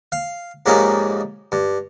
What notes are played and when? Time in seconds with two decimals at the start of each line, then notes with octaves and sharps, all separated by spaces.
0.12 F5
0.66 F2 G#2 G3 A#3 C#4 D#4
1.52 G2